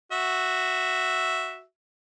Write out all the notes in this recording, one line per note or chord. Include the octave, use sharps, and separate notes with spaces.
F#4 E5